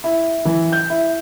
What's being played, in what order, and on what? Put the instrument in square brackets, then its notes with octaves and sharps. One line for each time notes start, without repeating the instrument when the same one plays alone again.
[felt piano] E4
E3
G6
E4